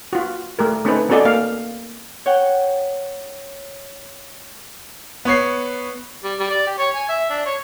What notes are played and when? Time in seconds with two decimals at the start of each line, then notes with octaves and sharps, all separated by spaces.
0.13 F4 F#4
0.59 A3 G4 A#4
0.85 A3 C4 C#4 D#4 A4 B4
1.09 B3 C#4 F#4 A4 D5 D#5
1.25 A#3 F5
2.26 C#5 F#5 G5
5.25 B3 C#5 C7
6.24 G3
6.39 G3
6.51 D5
6.67 G4
6.78 C#5
6.95 G#5
7.09 E5
7.30 D4
7.46 C#5